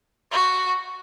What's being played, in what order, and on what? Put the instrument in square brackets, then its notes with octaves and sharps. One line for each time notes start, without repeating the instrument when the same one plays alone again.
[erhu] F#4